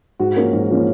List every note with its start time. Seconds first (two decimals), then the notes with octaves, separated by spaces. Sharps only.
0.20 G#2 F#4
0.37 F3 A#3 C#4 A#4
0.53 G#2
0.71 F3 A#3 C#4